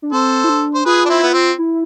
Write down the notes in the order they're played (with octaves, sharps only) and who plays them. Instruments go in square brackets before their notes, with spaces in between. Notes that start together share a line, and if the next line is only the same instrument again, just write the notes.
[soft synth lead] D4
[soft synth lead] C4 [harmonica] A4 C5
[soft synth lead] E4
D4
[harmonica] C5
[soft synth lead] F4 [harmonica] G#4 B4
[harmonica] D4
C4 E4
B3
C4
[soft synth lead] E4